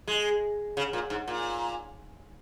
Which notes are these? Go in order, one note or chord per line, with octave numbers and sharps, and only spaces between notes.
G#3
C#3
A#2
G#2
A#2